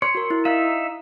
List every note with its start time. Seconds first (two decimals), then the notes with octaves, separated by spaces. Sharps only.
0.02 C#5 C6
0.15 F#4 A#4
0.30 E4
0.45 D#4 E5 F5